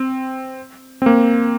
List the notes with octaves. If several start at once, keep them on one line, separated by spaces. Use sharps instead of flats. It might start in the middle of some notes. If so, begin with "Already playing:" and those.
Already playing: C4
C4
A#3